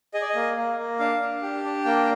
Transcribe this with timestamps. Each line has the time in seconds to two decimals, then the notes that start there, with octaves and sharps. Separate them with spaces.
0.14 G#4 D#5
0.22 D5
0.29 D#5
0.35 A#3
0.57 A#3
0.78 A#3
0.99 D4 F5
1.21 D4
1.42 G4
1.64 D4
1.85 A#3 G5